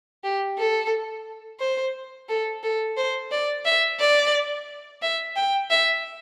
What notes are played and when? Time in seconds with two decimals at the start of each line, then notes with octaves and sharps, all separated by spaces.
0.24 G4
0.58 A4
1.60 C5
2.29 A4
2.63 A4
2.97 C5
3.31 D5
3.65 E5
4.00 D5
5.02 E5
5.36 G5
5.70 E5